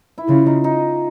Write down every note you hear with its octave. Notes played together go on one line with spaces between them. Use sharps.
E4
C#3 F4
D#4
D#4